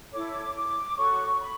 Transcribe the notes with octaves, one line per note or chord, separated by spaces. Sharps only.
E4 A4 C#5 D6
D6
F#4 A4 C#5 C#6
B5